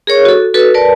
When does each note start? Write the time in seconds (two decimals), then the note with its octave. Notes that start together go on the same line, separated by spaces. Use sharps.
0.07 G#4 A#4 C#5 C#6
0.25 F#4 A4
0.54 F#4 A4 B4
0.74 A#4 B4 D5 A5